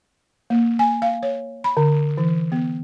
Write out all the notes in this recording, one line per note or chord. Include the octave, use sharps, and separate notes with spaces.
A#3
G#5
F5
C#5
B5
D3
E3
B3